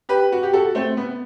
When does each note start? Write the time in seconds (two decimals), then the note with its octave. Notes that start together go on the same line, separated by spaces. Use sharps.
0.09 G4 B4
0.32 F#4
0.43 G4
0.53 F#4 A4
0.75 A3 C4
0.97 B3